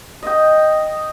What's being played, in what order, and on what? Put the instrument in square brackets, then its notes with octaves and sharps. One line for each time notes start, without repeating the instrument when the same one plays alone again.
[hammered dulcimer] D#5 G5